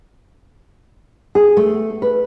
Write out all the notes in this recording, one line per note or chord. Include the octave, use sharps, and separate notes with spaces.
G#4
A3
B4